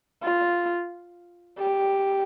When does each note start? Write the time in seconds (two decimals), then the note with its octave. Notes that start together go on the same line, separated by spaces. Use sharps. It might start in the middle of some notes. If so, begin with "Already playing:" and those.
0.23 F4
1.58 G4